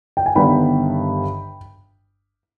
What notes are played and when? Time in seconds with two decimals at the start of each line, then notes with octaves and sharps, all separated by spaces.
0.17 G5
0.26 G#5
0.35 G1 G2 D#3 G3 B3 G5 B5